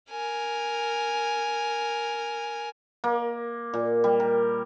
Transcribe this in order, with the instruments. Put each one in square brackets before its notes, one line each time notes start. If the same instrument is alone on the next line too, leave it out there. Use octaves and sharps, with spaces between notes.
[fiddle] A#4 G#5
[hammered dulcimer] A#3
A#2
G3
A#4